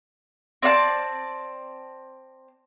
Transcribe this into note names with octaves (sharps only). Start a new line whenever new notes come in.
C4 D5 F5 A5